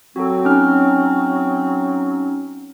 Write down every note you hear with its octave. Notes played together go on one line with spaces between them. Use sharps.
F#3 C4 F#4 A4
C#4 D#4 F6